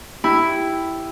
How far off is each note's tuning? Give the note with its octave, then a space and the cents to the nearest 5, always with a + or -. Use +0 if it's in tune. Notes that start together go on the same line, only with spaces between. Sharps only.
E4 +0 G4 +0 B5 +10